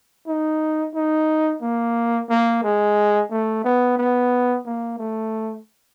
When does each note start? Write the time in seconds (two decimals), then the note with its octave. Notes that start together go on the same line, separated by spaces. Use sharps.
0.27 D#4
0.94 D#4
1.62 A#3
2.29 A#3
2.63 G#3
3.30 A3
3.64 B3
3.97 B3
4.65 A#3
4.99 A3